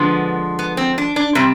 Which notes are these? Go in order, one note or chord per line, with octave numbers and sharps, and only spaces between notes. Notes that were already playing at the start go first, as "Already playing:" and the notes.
Already playing: D3 F3 G#3 B3
B3
C4
D4
D4
C3 G3 C4